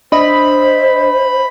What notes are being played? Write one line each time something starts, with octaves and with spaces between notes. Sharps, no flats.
D4 C5 D#5 E5 B5